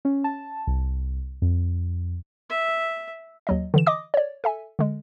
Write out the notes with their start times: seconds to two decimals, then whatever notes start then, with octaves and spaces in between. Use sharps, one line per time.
0.05 C#4
0.24 A5
0.67 C2
1.42 F2
2.50 E5
3.47 D#2 F#3 D#5
3.74 D3 E3 E7
3.86 D#5 D6 D#6
4.14 C#5 D5
4.44 A4 E5 G#5
4.79 D3 G#3